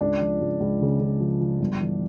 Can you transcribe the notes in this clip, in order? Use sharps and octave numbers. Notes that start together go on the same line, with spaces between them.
C#2 D4
F3
C#2
C#2
C#3
C#3
F3
F3
G1
E3